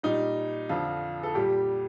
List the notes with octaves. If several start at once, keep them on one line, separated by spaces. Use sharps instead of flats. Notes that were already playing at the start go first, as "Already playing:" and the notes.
A#2 G3 D#4
F2 D3 F3 F4
A4
A#2 G3 G4